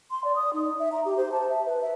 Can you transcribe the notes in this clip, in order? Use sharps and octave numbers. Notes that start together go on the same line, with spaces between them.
C6
D5
D#6
D#4
E5
A#5
G4
C5
A5
E5
B4
E5